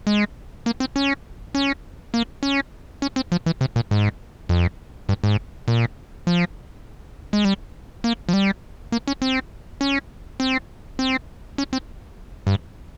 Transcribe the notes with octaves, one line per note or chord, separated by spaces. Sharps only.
G#3
A#3
C4
C#4
C#4
A#3
C#4
C#4
C4
F3
E3
C3
A#2
G#2
F2
G2
G#2
A#2
F3
G#3
G3
A#3
F3
G3
A#3
C#4
C4
C#4
C4
C4
C#4
C4
G2